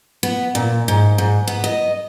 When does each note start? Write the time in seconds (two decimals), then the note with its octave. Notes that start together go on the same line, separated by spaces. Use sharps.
0.23 B3
0.55 A#2
0.88 G#2
1.18 G#2
1.48 B3
1.64 D#5